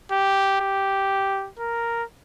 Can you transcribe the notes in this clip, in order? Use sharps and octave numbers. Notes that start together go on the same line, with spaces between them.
G4
G4
A#4